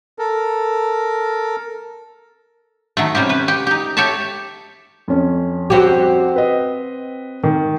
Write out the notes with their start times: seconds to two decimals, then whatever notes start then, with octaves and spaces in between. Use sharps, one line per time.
0.19 A4 A#4
2.97 D#3 F#3 A3
3.15 C3 G3 C#4 G4
3.29 C#4 B4
3.48 G4
3.67 D#4 G4
3.97 G4 A4 C#5 E5 A5
5.08 F2 C#4
5.70 C4 F#4 G4
6.36 B4 D#5
7.44 D#3